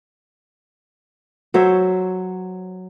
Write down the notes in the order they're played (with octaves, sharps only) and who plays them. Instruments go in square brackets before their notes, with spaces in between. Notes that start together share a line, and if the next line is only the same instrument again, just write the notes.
[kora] F#3 C5 C#5 E5